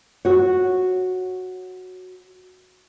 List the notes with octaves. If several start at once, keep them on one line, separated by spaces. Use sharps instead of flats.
F#4 C#5